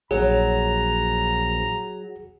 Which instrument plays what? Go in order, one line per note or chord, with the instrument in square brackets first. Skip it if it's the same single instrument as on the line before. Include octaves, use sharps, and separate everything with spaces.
[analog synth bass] A#1 [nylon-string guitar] F#3 [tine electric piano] G#4 [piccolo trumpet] A#5